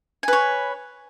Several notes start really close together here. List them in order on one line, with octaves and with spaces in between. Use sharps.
G#5 B4 C#5